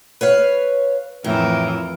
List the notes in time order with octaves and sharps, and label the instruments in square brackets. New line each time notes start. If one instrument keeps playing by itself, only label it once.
[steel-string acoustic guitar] B4 C#5 F5
[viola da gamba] F2 E3 A#4 [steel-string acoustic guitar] A2